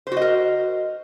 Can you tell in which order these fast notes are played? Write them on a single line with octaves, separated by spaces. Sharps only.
C5 F#4 D#5 A#4